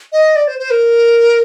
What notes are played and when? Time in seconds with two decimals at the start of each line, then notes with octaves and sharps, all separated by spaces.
0.13 D#5
0.36 D5
0.48 C5
0.59 C5
0.71 A#4